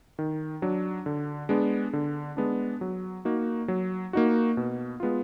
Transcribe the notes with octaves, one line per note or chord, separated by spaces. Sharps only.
D#3
F#3 D4
D3
G#3 B3 D4
D3
G#3 B3 D4
F#3
A#3 D#4 F#4
F#3
A#3 D#4 F#4
B2
G#3 B3 F4